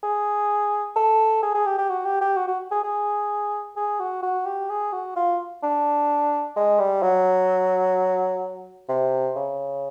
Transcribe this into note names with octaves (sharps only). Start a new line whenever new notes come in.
G#4
A4
G#4
G#4
G4
G4
F#4
G4
G4
F#4
F#4
G#4
G#4
G#4
F#4
F#4
G4
G#4
F#4
F4
D4
G#3
G3
F#3
C3
C#3